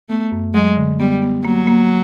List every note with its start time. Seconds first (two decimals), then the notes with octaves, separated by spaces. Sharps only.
0.09 A3 B3
0.32 F#2
0.54 F#3 G#3
0.77 D3
1.00 G3 B3
1.22 B3
1.45 F#3 A#3
1.67 A#3